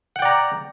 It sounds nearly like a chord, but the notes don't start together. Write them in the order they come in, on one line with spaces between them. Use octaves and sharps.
F#5 G5 D5 A#5